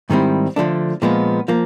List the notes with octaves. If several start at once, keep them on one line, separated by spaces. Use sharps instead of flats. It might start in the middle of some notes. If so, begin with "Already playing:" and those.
G#2 D#3 G3 C4 E4
D3 F3 A3 D4
A#2 F3 G#3 B3
F3 A#3